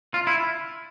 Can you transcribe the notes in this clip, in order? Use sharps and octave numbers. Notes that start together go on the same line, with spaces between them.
F4
E4